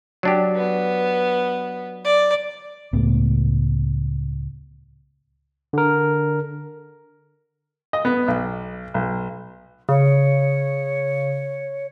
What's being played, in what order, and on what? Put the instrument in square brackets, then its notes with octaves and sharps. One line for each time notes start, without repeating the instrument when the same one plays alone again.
[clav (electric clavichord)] F#3 D4 G4
[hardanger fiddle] B3
D5
[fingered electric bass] C#2 A2 A3 B3
[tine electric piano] D3 A#4
[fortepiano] D#5
B3
B1
B1
[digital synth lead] C#3 [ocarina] C#5